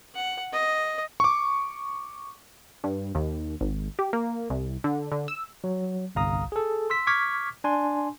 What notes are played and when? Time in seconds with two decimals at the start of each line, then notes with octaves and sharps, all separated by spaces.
0.15 F#5
0.52 D#5
1.20 C#6 D6
2.84 G2
3.15 D#2
3.61 G#1
3.99 G4
4.13 A#3
4.50 C2
4.84 D3
5.12 D3
5.28 E6
5.64 F#3
6.15 G1 C2 F5 A#5 D#6
6.52 G#4 A4
6.90 C6 E6 B6
7.07 C#6 D6 F6 G#6 B6
7.64 D4 G#5 C6